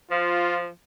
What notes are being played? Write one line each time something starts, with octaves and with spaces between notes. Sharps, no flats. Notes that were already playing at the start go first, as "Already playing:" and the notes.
F3 F4